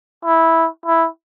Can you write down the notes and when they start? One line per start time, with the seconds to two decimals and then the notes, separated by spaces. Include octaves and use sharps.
0.25 E4
0.86 E4